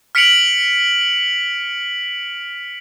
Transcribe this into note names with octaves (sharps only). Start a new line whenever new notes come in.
F6 B6 C#7 D7 F7 F#7